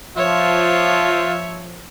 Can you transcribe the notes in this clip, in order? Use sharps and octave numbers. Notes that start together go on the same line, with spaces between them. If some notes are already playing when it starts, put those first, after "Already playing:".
F3 F4 C#5 E5